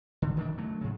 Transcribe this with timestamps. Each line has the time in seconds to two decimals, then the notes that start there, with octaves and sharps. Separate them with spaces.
0.22 D3
0.37 D#3 E3 D4
0.58 F#3 A3
0.81 G#2 C#3